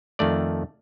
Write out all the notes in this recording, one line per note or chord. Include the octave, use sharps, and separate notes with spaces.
F2 D#3 A3 D5